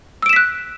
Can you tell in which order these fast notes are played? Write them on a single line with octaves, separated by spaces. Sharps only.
E6 D7 E7 B6 F#6